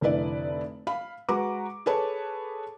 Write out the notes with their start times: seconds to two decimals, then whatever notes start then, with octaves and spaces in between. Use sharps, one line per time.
0.01 F1 D3 E4 B4 D5
0.87 F5 B5
1.29 G#3 F#4 B4 A#5 D6
1.86 G#4 A4 B4 C#5 A5